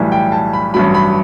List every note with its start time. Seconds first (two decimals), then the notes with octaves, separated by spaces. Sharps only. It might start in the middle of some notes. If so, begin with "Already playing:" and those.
Already playing: B1 A2 E3 G3
0.12 G5
0.32 A5
0.53 B5
0.74 A1 G2 F#3 B5
0.94 B5